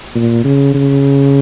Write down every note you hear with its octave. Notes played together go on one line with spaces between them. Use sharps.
A#2
C#3
C#3